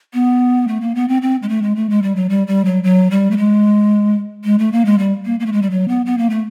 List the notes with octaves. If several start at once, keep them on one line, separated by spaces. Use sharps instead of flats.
B3
A3
A#3
B3
C4
C4
G#3
A3
G#3
A3
G#3
G3
F#3
G3
G3
F#3
F#3
G3
A3
G#3
G#3
A3
A#3
G#3
G3
A#3
A#3
A3
G#3
G3
F#3
B3
B3
A#3
A3